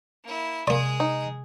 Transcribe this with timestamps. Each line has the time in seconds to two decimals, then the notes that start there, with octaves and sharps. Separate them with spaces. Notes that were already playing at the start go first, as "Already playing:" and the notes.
0.24 A#3 E4
0.67 C3 G#3 A#3 G#4 D5
1.00 D#4